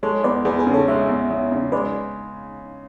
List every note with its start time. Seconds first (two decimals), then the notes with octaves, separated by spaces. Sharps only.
0.03 G#3 A4 C#5
0.24 E2 B4 D5
0.45 E2 G#4 B4
0.59 G#4 B4
0.67 C#3
0.74 A4 C#5
0.88 G#3 C#5 E5
1.09 E2
1.30 E2
1.52 C#3
1.72 G#3 B4 D5